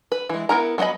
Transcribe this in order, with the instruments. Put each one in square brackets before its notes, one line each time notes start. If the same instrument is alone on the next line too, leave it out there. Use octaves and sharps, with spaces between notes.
[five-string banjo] B4
E3 G#3
B3 E4 A#4 A#5
F#3 A3 B3 D#5 B5